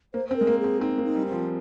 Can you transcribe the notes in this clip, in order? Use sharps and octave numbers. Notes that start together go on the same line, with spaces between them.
A#3 C5
C4 C5
G#3 A#4
A#3
G#4
C4
C4 D#4
A#3
D#4
G3
C4
F3